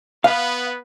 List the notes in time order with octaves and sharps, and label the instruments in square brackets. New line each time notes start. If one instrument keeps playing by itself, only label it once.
[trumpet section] B3 B4 [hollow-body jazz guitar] F5